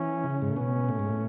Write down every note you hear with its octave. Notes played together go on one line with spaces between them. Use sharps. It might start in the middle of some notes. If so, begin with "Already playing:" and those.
Already playing: E3 C#4
C#3
G#2
A2
B2 C#4
A2
G#2
A2